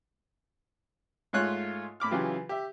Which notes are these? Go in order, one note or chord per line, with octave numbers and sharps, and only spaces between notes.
G#2 G#3 A3 F4 C#5 F#6
A2 B5 D6 F6
C#3 E3 F#3 F4 G4
G4 E5